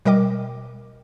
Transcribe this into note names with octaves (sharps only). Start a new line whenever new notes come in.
B2 G3 A#4 D#5 G5 D6